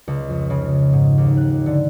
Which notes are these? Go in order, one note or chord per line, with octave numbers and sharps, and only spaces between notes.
C#2
F2
C#3
G#2
D#2
F#6
D3